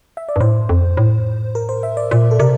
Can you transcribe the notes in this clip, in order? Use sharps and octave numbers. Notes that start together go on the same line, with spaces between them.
E5
D5
G2
A2 C5
F2
A2
A#4
C5
E5
D5
A#2 C5
A4
C3 A#4